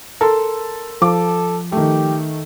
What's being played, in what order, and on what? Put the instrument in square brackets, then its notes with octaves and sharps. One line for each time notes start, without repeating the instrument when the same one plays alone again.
[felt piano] A4 [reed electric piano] A#4 C6
[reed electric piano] F3 [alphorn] A4 [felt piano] D6
[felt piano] D#3 A3 [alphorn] G4